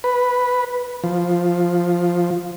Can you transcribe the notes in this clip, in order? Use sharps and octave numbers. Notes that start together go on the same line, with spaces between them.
B4
F3